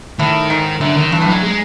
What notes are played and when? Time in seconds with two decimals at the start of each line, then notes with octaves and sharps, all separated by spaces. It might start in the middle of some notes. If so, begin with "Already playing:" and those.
0.19 A2 D#3
0.50 G#2
0.81 F#2 D3
0.97 D#3
1.12 G2 E3
1.21 A2
1.27 G#2 F#3
1.43 G#3